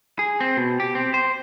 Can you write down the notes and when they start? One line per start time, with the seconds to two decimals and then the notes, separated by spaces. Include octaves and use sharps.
0.19 G#4
0.41 C4
0.57 B2
0.80 G4
0.95 C4
1.14 C5